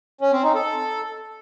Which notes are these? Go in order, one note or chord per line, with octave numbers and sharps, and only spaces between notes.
C#4
C4
D#4
A4